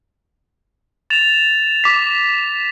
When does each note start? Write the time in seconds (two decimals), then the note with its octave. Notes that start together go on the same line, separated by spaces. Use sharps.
1.10 A6 E7 F7
1.84 D6 B6